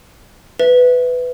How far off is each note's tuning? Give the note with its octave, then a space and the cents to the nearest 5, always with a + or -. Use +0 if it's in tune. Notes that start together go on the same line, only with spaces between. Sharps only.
B4 +10 E5 +0